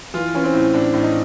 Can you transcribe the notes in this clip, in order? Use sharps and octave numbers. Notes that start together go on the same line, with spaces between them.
E3 F4
E3 C#4
C4
A2
A2 D4
A2
D#4